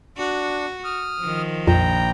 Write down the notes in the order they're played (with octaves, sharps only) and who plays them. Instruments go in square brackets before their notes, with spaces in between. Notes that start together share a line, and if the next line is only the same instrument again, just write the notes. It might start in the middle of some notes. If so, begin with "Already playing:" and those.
[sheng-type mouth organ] D4 [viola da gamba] F#4
[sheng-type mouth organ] D#6 F6
[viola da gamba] D#3 F3
[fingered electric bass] A#1 [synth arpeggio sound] F2 [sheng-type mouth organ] G5 A#5